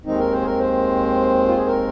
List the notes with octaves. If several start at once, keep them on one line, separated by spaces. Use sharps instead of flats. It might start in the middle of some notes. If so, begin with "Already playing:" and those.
D#2 D#3 G#3 C4 D#4
A#4
C5
G#4
A#4
C5
F4
G#4
A#4